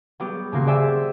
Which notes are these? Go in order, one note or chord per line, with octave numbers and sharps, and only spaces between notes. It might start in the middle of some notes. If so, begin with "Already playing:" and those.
F#3 G3 B3 G4
D#1 C#3 A#3 F#4 A#4 C6
C5 D5 E5 G5 G#5 E6